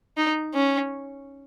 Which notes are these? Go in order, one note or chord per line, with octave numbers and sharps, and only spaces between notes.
D#4
C#4